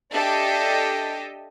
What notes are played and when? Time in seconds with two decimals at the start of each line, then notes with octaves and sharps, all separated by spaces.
0.12 D4 G4 A4 D#5 E5